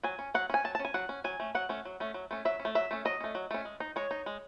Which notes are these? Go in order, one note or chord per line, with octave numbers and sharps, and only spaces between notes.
F#3 G#5
C#4
F#3 F#5
C#4 G#5
F#3 A5
A5
C#4
G#5
F#3 F#5
C#4
F#3 G#5
A3 C#4
F#3 F#5
A3 C#4
F#3
A3 C#4
F#3
A3 C#4
F#3 E5
C#4
A3
F#3 E5
A3 C#4
F#3 D#5
A3 C#4
F#3
A3 C#4
G#3
D#4
G#3 C#5
D#4
G#3